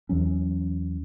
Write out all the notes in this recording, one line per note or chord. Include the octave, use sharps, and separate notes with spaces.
E2 E3 F#3 C#4